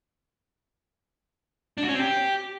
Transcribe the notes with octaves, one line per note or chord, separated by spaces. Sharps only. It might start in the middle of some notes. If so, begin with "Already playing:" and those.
D4
F#4
C#4
C4
G4